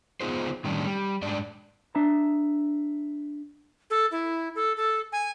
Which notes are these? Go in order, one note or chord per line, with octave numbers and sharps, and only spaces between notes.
B3 D#4 F4 G#4 C5
A2 D#3 G3 C#4 D4
G3
G#2 D4 D5
D4 E5 A5 A#5
A4
E4
A4
A4
G#5